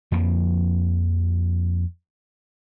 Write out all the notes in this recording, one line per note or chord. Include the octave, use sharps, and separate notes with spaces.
F2 F3 A#3